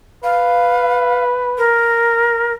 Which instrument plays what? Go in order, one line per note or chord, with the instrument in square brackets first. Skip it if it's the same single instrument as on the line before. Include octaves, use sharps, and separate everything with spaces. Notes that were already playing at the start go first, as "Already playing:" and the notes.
[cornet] B4 [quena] F5
[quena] A#4